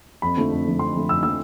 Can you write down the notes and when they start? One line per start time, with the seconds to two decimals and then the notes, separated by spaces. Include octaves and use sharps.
0.22 F2 B5
0.37 D3 F3 A3
0.52 F2
0.66 D3 F3 A3
0.79 F2 C6
0.95 D3 F3 A3
1.09 F2 E6
1.22 D3 F3 A3 E6